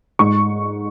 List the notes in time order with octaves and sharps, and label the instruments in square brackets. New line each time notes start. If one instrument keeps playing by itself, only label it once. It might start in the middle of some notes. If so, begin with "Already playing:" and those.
[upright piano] G#2 C#6